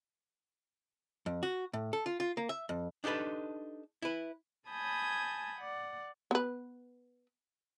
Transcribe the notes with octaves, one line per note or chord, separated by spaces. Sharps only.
F2
F#4
A2
A4
F4
F4
A#3
E5
F2
D4 D#4 G4 A4 B4
E4 B4
G#5 A5 B5 D#6 G6 G#6
D5 F#5
B3 B4